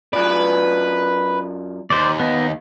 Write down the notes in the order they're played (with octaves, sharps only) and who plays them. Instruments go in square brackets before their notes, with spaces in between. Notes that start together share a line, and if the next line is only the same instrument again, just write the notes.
[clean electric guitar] F#2 F4 D5 [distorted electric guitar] B4
[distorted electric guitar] D#2 [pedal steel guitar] C5 D5
[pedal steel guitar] B3 D#4